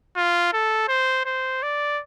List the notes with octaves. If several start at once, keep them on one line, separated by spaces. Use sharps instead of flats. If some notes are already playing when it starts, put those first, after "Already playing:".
F4
A4
C5
C5
D5